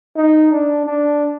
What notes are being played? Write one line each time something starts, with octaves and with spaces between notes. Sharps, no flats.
D#4
D4
D4